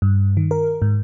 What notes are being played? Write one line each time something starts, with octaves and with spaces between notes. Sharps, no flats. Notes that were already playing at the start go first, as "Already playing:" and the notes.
G2
D#3
A#4
G#2